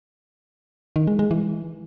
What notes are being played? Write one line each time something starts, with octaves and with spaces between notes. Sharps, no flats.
D#3
G#3
G#3
E3